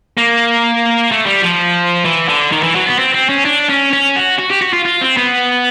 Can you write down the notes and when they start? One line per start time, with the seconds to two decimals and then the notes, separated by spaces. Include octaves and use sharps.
0.18 A#3
1.12 A3
1.27 G3
1.42 F3
2.05 E3
2.28 D3
2.52 D#3
2.63 E3
2.75 F#3
2.86 B3
2.98 C4
3.14 C4
3.29 C#4
3.45 D4
3.69 C#4
3.93 C#4
4.16 F#4
4.39 F#4
4.51 G4
4.62 F#4
4.74 F4
4.85 F4
5.01 C4
5.17 B3